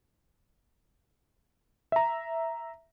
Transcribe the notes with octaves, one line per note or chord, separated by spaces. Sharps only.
E5 A#5